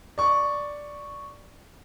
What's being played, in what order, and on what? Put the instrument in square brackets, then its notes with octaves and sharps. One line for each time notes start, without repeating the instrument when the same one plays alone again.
[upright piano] D5 C#6